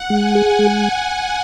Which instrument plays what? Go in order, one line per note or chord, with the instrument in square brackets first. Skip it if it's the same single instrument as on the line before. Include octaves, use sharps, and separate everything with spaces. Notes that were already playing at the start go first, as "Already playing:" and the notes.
Already playing: [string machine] F#5
[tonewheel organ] G#3 [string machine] G#5
[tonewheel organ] G#4
G#3